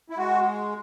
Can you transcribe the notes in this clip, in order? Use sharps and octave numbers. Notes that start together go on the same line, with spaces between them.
E4
G#3 F#4